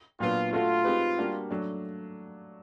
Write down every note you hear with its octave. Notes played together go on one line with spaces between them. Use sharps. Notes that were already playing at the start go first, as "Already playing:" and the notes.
A#2 F#3 B3 D4 F4
A3 D4 F4 F#4 A4
G#3 C4 D#4 G4 B4
G3 A#3 D4 F#4
F#3 A3 D4